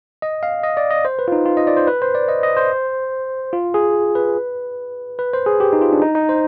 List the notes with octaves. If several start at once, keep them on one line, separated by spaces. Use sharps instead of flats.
D#5
F5
D#5
D5
D#5
C5
B4
F4
D#4
F4
D#5
D5
C5
B4
C5
D5
D#5
D#5
C5
F4
G#4
B4
B4
C5
G#4
G4
D#4
F4
D4
D#4
D#4
C5